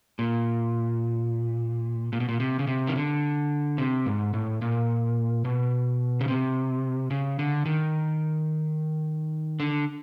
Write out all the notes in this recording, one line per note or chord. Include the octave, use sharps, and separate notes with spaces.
A#2
A#2
B2
A#2
C3
C#3
C3
D#3
D3
C3
G#2
A2
A#2
B2
C#3
C3
C#3
D3
D#3
D3